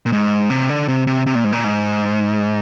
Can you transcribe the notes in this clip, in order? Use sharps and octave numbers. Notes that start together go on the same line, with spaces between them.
A#2
G#2
C3
D3
C3
C3
C3
A#2
G#2
A#2
G#2